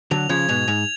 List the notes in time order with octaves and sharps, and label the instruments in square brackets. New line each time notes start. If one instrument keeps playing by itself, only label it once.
[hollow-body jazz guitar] D3 F#3 [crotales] F7
[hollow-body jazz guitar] C#3 F3 [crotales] G#6
[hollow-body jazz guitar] G#2 B2 [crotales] F7
[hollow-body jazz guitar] G#2 [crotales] F7